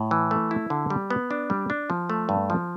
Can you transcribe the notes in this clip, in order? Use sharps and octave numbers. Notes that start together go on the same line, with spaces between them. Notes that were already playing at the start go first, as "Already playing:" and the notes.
Already playing: A2
E3
A3
E4
D3
G3
B3
D4
G3
D4
F3
A3
G2
F3